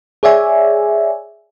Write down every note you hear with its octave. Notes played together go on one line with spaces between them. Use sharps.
G#4 C#5 D5 E5 G#5